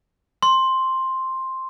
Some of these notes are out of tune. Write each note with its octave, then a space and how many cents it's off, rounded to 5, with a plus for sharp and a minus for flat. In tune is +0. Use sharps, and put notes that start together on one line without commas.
C6 +5